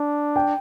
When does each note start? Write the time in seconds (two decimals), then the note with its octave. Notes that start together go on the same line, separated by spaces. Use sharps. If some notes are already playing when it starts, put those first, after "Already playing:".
Already playing: D4
0.36 G5